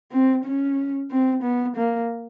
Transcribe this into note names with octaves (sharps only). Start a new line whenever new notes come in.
C4
C#4
C4
B3
A#3